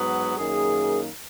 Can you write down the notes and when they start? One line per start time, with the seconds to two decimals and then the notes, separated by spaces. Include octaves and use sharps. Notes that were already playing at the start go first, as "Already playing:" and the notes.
Already playing: G#2 F#3 B3
0.37 F#2 D#3 A#3 G#4